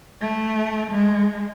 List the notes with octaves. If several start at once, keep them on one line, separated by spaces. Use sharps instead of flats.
A3
G#3